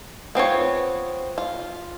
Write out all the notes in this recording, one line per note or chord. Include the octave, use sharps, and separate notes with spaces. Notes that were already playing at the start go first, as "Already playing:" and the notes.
B3 C4 F4 C#5
F4